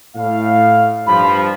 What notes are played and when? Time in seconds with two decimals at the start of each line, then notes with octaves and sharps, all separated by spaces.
0.16 A2 F5
1.07 G2 F3 B5